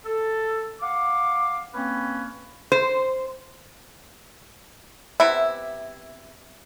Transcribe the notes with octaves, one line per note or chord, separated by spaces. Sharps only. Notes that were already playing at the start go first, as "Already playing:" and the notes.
A4
F5 F#5 D6
A#3 C4 C#4 B4
C5
C3 B3 E4 E5